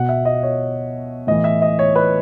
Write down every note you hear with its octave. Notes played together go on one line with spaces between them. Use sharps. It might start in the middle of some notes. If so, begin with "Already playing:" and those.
Already playing: B2 F#5
E5
D#5
C#5
A2 E3 D#5
E5
D#5
C#5
B4